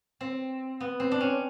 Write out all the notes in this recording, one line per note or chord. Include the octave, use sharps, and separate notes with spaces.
C4
B3
C4
D4
C#4